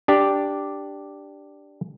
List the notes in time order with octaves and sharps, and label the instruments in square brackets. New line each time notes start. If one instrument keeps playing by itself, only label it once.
[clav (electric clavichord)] D4 G4 D5